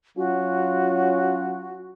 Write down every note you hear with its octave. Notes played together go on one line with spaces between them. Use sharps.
F#3 C#4 F4 F#4